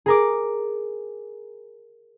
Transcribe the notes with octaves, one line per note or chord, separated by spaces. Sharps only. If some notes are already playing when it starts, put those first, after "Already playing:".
G#4 A#4 D6